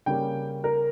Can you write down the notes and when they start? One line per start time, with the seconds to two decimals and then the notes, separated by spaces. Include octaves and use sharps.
0.06 C#3 G3 A#3 C#4 G5
0.64 A#4